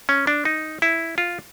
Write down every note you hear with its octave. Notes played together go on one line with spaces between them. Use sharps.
C#4
D4
D#4
E4
F4